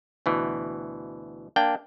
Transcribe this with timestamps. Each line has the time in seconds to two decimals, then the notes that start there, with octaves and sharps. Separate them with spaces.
0.26 D2 B2 E3
1.56 A#3 D4 G5